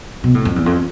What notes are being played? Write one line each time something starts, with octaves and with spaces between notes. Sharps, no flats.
B2
A2
F2
E2
F2